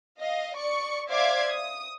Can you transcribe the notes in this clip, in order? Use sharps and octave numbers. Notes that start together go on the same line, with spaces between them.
D#5 F5
D5 C#6 C#7
C5 D5 E5 F5 D6 G#6
D#6